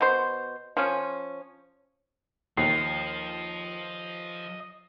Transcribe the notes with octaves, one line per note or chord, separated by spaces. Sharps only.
B2 C5
F3 C#4
D#2 F3 D#5 C7